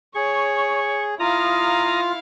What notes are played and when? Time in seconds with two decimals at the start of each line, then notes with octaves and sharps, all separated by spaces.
0.15 G#4 C#5 C#6
1.19 E4 F4 F5 A#5 D#6